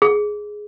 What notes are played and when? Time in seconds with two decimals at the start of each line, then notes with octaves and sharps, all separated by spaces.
0.02 G#4